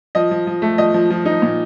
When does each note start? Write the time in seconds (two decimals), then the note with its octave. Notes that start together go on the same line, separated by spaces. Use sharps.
0.15 F3 D#5
0.31 F3
0.47 F3
0.62 A3
0.78 F3 D#5
0.94 F3
1.10 F3
1.26 D#4
1.42 A#2